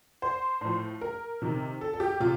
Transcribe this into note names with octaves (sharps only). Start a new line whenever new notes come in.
C5
A2 F3
A#4
C3 D#3
A4
A4
G4
C3 F4